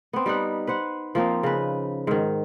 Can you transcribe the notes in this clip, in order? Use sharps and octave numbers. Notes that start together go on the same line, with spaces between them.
B3 C4
G3 D#4 B4 F#5
B4 C5 F#5
F3 A#3 C4 D#4
C#3 B4
G#2 D#3